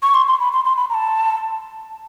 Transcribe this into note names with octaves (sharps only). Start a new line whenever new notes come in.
C#6
C6
C6
B5
C6
C6
B5
A#5
A5